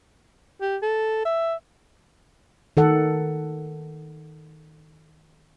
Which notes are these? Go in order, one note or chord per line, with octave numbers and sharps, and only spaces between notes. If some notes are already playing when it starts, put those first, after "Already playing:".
G4
A4
E5
D#3 A4 F#5